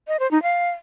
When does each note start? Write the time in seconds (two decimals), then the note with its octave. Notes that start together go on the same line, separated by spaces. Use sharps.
0.08 D#5
0.19 C5
0.31 D#4
0.43 F5